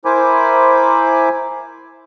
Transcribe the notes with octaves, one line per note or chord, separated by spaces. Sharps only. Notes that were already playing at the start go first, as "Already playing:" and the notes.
E4 A#4 C5 G#5 B5 D6